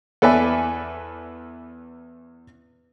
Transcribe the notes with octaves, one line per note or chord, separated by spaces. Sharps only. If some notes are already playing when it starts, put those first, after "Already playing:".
E2 A4 B4 D5 E5 G#5